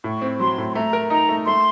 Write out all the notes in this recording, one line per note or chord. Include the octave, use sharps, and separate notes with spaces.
A2 C#6
C4
F#3 C6
A2
C6
A3 A#5
A#4
D#4 A#5
A3
A3 C6